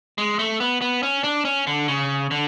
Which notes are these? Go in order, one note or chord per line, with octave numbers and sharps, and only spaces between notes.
G#3
A3
B3
B3
C#4
D4
C#4
D3
C#3
D3